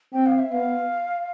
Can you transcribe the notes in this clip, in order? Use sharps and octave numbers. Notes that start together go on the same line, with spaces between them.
C4 G5
F5
E5
B3 F5